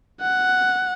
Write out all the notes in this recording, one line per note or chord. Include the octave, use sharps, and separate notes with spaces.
F#5